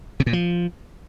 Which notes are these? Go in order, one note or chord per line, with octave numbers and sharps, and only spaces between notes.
C3
A#2
F3